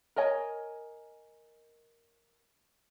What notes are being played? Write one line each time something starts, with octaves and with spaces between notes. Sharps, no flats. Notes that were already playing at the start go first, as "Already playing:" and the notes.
A#4 C#5 D#5 G#5